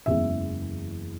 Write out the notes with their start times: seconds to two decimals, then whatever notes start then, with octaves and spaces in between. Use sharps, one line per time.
0.06 F#1 E2 C#3 E3 G#3 E5